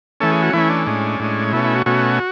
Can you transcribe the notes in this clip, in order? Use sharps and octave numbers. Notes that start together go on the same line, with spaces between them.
E3 A3 C#4 A4
G#4
F#4
E3 A3 C#4 E4
D4
A2 G#3 C#4
A2 G#3 C#4
B2 A3 C#4 E4
E4
F#4
B2 A3 C#4 F#4